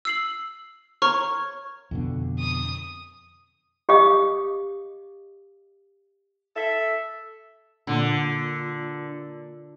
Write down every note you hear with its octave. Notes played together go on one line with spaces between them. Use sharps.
E6 C7 F#7
C#5 A#5 C#6 F6
F2 B2 D3
D#6
G4 D#5 F5 D6 D#6
A4 E5
A#2 D3